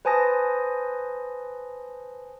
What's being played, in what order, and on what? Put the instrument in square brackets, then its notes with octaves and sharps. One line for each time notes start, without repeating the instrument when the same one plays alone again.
[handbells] B4 C5 G#5 A5 D#6 A#6